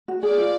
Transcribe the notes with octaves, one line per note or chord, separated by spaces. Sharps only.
F#4
G#4 D5
F4